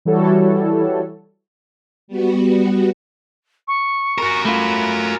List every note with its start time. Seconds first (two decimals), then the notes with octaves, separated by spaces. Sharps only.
0.05 E3 G3 E4 F#4 A4 C#5
2.08 G3 B3 F#4
3.68 C#6
4.18 F#4 A#4
4.45 A3 F4 B5